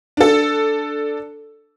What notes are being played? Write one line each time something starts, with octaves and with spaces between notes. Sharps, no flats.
D4 A4